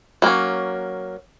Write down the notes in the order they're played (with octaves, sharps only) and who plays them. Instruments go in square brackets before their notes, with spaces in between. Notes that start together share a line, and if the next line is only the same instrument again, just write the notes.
[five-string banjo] F#3 A#3 C#4